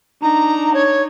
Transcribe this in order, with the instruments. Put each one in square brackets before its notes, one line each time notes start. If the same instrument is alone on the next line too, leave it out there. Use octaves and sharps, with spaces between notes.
[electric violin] D4 D#4 [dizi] A#5
[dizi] C#5